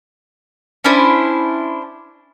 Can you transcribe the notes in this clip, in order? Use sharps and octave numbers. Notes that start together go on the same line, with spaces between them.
C#4 D4 E4 C5